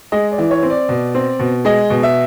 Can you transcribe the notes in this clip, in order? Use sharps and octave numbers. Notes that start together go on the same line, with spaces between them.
G#3 D#5
D5
E3
C#5
C4
D5
B2
C4
B2
G#3 D#5
B2
E5